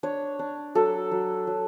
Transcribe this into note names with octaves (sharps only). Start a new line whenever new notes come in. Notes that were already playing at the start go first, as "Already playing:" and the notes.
D4 C#5
D4
F#3 A4
F#3
F#3